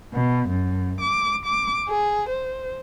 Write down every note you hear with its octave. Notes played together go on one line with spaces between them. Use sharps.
B2
F#2
D6
D6
G#4
C5